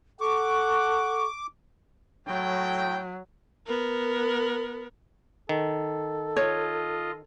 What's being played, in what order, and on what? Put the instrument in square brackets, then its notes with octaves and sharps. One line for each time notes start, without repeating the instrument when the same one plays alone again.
[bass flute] A4 [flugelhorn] F#5 [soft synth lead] C#6 [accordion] D6
[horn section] A2 G5 [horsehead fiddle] F#3
[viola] B3 A#4
[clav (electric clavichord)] D#3 [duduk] A4
[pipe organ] F4 D#5 [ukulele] C#5